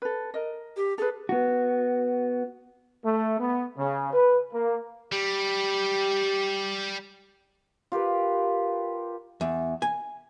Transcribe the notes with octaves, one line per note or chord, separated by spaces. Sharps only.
A4 B4
A#4 D#5
G4
G#4 A4 B4
B3 F#4
A3
B3
C#3
B4
A#3
G3 G4
F4 G4 A#4 B4
E2
G#5